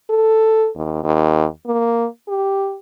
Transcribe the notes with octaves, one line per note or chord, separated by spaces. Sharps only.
A4
D#2
D#2
A#3
G4